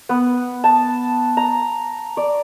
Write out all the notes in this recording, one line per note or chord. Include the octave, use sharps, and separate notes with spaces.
B3
A5
A#5
D5